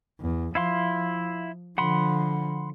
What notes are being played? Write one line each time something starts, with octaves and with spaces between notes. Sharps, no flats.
E2
F3 E4 F5 C6
D3 F3 F#5 B5 C6